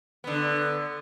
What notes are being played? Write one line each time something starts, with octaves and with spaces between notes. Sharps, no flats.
D3 B3